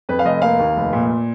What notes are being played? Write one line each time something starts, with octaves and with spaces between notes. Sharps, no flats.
F2 B4
F5
F1 D#5
A#3 F5
D#2
F1
A#2